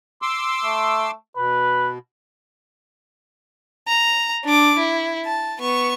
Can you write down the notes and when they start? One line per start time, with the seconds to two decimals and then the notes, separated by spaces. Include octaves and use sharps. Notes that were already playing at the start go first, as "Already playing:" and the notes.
0.22 C6 D6 E6
0.64 A3
1.37 B2 B4
3.87 A#5
4.45 D4 D6
4.78 E4
5.25 A5
5.60 B3 C#6